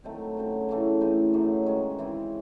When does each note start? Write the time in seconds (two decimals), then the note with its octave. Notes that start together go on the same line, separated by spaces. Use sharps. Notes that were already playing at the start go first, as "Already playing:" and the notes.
0.04 D#3 F#3 A3 C4
0.37 C#3 F#3 C4
0.69 C#3 E3 A3
1.01 A2 E3 C4 D#4
1.34 F#2 C#3 F#3
1.66 D#3 G#3 C#4
1.98 C#3 E3 C4 E4